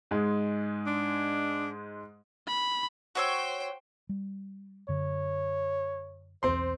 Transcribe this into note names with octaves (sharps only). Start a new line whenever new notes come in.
G#2 G#3
D4
B5
F#4 C5 C#5 G5 E6
G3
F#2 D3 C#5
B1 E2 C4 C5 C6